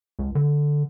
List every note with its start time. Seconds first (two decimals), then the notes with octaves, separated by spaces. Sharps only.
0.19 C#2
0.35 D3